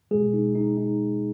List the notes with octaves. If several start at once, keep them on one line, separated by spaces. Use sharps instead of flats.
B2 G#3 G#4
D#4
D#4
D#4